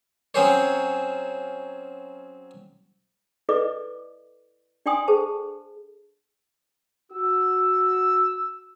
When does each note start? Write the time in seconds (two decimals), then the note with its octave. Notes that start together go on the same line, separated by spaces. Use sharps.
0.34 F#3 C4 C#4 G#4 C5 C#5
3.49 E4 A4 B4 D5 D#5 D6
4.86 D4 D5 G5 G#5 C6 D#6
5.08 G#4 A4 C5 A5
7.12 F#4 E6